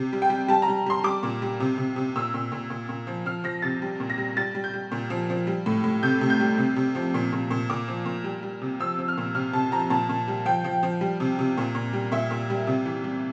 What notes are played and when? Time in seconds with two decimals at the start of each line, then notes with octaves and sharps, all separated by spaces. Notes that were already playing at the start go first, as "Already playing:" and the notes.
Already playing: C3
0.13 G3
0.22 G5
0.30 G3
0.48 G3 A5
0.62 A#5
0.68 G3
0.86 G3 C6
1.04 G3 D6
1.23 A#2
1.42 G3
1.60 C3
1.78 C3
1.96 C3
2.16 A#2 E6
2.34 A#2
2.52 A#2
2.70 A#2
2.89 A#2
3.07 F3
3.26 F3 F6
3.44 F3 A#6
3.62 C3 A6
3.82 G3
4.00 A#2
4.10 A#6
4.18 G3
4.37 G3 A6
4.55 G3
4.64 G6
4.74 G3
4.92 A#2
5.10 F3
5.30 F3
5.47 G3
5.66 A2
5.84 A2
6.03 C3 G6
6.21 C3
6.30 G6
6.40 G3
6.58 C3
6.76 C3
6.95 F3
7.14 A#2
7.33 A#2
7.51 A#2
7.70 A#2 D6
7.88 F3
8.05 A#2
8.24 G3
8.43 G3
8.62 C3
8.80 F3 E6
8.99 F3
9.08 F6
9.17 A#2
9.35 C3 F6
9.53 C3 A5
9.72 F3 A#5
9.90 A#2 A5
10.09 A#2
10.28 G3
10.46 F3 G5
10.64 F3
10.83 F3
11.01 G3
11.20 C3
11.39 C3
11.58 A#2
11.75 A#2
11.93 G3
12.12 A#2 E5
12.31 A#2
12.50 G3
12.67 C3
12.86 E3
13.04 G3